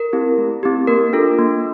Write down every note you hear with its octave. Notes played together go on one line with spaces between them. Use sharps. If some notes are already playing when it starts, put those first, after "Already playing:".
Already playing: A#4
C4 E4 G4
A3
C4 E4 G4
A#3 A#4
D4 F4 A4
A#3